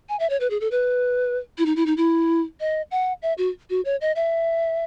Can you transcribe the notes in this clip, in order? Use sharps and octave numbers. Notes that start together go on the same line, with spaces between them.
G#5
E5
C#5
B4
G#4
A4
B4
E4
D#4
E4
D#4
E4
D#5
F#5
E5
F#4
F#4
C#5
D#5
E5